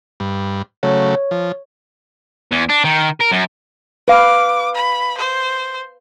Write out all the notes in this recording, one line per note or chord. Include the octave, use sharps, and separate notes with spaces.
G2
C#3 F#3 A3 C#5
F3
E2
D4
D#3
A#4
F#2
B4 F5 D6
B5
C5